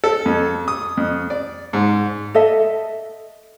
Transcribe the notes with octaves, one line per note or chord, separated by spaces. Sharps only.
A4
F2
D#6
F2
D5
G#2
A4 D#5 E5